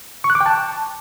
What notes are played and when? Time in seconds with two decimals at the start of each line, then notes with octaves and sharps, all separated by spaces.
0.24 C#6
0.30 F#6
0.35 D6
0.40 G5
0.46 A5